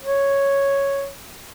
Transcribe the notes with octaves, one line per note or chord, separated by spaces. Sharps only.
C#5